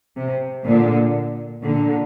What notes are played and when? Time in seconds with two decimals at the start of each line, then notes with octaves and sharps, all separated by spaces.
0.17 C3
0.65 A#2 D3
1.64 A#2 D3